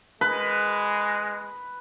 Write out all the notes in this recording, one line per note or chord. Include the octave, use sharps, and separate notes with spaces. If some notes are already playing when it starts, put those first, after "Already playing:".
G#3 B4